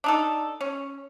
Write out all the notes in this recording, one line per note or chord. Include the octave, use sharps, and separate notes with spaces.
D4 D#4 A4
C#4